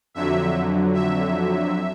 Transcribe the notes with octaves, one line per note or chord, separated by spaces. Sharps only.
F2 D3 F#3 E5
E5